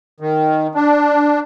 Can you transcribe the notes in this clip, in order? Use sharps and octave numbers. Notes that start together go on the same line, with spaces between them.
D#3
D4